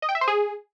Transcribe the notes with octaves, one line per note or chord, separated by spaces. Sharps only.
D#5
G5
E5
C5
G#4